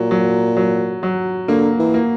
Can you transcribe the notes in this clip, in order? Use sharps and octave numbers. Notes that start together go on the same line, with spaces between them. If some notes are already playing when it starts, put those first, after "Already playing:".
Already playing: A#2 F#3
F#3
F#3
F#3
D3 A#3
E3
A#3